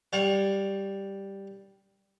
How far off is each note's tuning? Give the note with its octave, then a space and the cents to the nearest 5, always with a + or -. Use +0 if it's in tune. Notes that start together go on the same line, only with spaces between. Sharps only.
G3 +0 C#5 +0 F5 +40